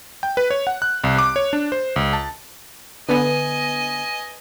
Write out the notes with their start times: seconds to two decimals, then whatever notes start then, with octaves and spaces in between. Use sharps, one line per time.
0.23 G5
0.37 B4
0.50 C#5
0.67 F#5
0.82 F#6
1.04 C2
1.18 D6
1.36 C#5
1.53 D4
1.72 C5
1.96 C#2
2.13 A5
3.09 D3 B3 B4 D#5 G#5